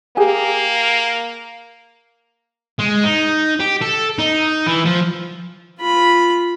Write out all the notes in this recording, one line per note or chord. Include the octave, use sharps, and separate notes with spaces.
A#3 G4 G#4 G#5
G#3
D#4
G4
A4
D#4
E3
F3
F4 B5